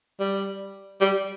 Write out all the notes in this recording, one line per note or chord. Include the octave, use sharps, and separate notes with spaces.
G3
G3